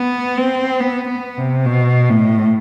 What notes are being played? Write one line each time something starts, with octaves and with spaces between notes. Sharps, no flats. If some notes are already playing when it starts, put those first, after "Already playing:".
Already playing: B3
C4
B3
B3
C3
B2
A2